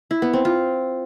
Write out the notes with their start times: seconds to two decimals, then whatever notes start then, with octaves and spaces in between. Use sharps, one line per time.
0.11 E4
0.22 B3
0.33 C4
0.45 F4